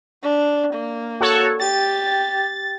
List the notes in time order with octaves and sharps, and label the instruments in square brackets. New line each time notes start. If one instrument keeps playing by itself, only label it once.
[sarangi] D4
A#3
[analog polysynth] F#4 A4 C#5
[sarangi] G4 [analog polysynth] A6